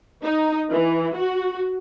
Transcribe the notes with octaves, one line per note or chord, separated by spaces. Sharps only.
D#4
E3
F#4